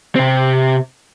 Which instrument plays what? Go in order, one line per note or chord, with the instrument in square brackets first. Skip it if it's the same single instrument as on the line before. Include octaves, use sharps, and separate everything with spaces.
[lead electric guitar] C3 C4